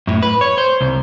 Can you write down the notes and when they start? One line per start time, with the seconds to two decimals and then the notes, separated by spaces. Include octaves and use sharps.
0.07 F#2 A2
0.23 B4
0.41 C#5
0.58 C5
0.81 C2